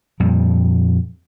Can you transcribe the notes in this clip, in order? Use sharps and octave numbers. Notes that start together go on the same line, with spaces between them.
F2 A#2 G3